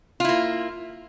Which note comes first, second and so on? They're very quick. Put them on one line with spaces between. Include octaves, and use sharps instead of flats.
F4 E4 A#3